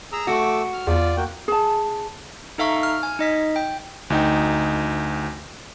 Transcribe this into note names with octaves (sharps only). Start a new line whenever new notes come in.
G#4 A#5 E6
A3 F#4 D6 E6
F6
E2 F4 D5
A#3 F#4 G5
G#4 A5
D#4 A4 E5 F5 A#5 C#6
F6
G#5
D#4 D#5 B6
G5
D2 D#4 G5